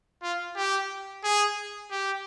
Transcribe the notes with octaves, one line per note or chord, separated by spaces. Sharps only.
F4
G4
G#4
G4